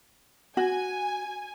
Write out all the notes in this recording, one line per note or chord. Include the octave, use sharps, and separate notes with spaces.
F#4 G#5